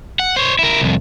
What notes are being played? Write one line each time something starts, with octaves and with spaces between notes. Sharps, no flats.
F#5
C5 C#5
E4 A#4
C2 F2